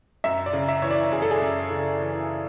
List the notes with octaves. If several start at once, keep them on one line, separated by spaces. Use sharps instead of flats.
F#2 E5
D5
C#3
E5
E3 C#5
D5
F#2 G#4
A4
G#4
F#2
C#3
E3